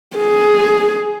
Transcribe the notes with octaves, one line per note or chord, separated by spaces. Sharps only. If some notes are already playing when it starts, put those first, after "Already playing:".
G#4